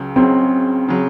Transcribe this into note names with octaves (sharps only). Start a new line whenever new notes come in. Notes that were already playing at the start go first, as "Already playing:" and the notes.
Already playing: C#2 C#3 F#3
C#2 C#3 F#3 C4
C#3 F#3